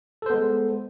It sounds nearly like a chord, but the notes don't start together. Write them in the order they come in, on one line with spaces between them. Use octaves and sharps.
A4 C5 B3 G#3